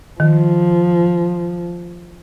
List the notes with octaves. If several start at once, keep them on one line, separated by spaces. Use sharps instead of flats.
D#3 F3